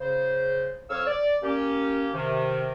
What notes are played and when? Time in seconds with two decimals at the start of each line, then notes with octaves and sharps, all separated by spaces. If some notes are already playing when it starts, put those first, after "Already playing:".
0.01 C#3 C5
0.90 F2 C#5 F5 E6
1.07 D5
1.43 A#3 C#4 G4
2.14 C3 D#3